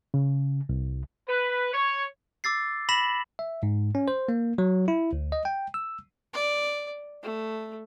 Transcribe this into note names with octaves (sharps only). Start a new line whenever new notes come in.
C#3
C2
B4
C#5
D6 E6 A6 C7
B5 A#6 B6 E7 F#7
E5
G#2
C#4
C5
A#3
F#3
E4
D2
D#5
G5
E6
D5
A3